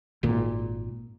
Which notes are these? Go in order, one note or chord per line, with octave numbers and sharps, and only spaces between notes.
G#1 A#2